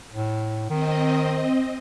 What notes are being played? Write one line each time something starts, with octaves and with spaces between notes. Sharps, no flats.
A2
D#3 C4 D#5